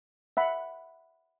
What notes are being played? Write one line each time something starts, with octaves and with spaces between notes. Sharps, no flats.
E5 F#5 B5